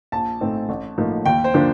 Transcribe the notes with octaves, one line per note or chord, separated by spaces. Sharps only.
A#1 A5
A2 A3 C4 D#4
A1
A2 F3 A#3 D#4
D#2 G5
C5
D3 F3 A#3 D4